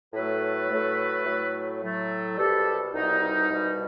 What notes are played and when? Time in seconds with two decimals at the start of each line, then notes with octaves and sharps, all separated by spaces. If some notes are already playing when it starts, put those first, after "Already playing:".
0.13 A2 F#3 A3 A4 B4
0.70 A2 F#3 A3
1.25 A2 F#3 A3
1.82 A2 F#3 A3
2.37 C2 B2 G3 G4 A4
2.93 C2 B2 G3 D#4
3.49 C2 B2 G3